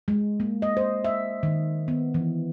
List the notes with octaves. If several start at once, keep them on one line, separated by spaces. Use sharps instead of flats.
G#3
A#3
D#5
C5
E5
D#3
B3
E3